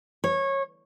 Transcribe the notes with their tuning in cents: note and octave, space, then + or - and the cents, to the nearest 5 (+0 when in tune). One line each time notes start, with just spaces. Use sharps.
C#5 -20